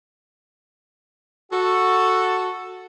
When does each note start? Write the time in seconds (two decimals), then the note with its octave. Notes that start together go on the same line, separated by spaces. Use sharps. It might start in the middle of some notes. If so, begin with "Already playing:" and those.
1.52 F#4 A4